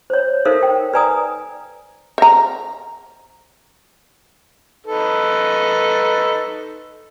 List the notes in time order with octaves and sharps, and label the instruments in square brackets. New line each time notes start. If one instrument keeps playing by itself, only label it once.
[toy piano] C5 C#5
D#4 A4 A#4 C5 E5 F5
G5
B4 D5 G#5 A#5 D#6
[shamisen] C5 A#5
[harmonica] D#4 A4 B4